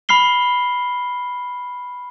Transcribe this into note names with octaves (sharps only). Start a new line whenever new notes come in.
B5 F6 C7 G7